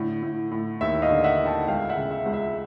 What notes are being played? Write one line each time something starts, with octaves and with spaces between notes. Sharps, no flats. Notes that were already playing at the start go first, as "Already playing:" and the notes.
Already playing: A2 D3
A2
A2
D#2 E5
D#5 F5
D3
E5 F#5
D3
G5 A5
C#2 F5 G5
E5 F#5
C#3
E5
C#2
E5